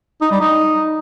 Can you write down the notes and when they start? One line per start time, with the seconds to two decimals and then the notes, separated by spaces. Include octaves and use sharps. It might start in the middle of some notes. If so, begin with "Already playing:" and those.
0.21 D#4
0.31 G3
0.41 D#4